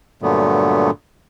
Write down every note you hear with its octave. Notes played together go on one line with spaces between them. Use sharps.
G2 A#2 D3 F#3 A3 B3